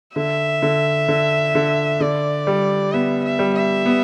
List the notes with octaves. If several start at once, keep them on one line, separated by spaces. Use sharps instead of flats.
D3 E5
D3
D3
D3
D3 D5
G3
B3 E5
E5
G3
E5
B3